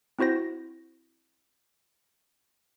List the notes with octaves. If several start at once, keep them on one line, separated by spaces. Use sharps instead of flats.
C4 E4 F#4 C5 A#6